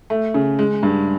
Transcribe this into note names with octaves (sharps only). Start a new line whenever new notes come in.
A3
C#3
G#3
G2